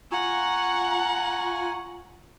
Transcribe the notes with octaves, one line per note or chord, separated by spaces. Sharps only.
F4 F#5 G#5 A#5 C#6